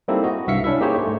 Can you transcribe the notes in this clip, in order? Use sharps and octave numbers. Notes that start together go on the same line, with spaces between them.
G3 A#3 C4 D#4 E4 A4
F#4 D#5
C2 G2 E5 F5 B6 C#7
C#4 D4 E4 E5
A#3 D#4 G4 G#4 C5 C#5
G#2 A3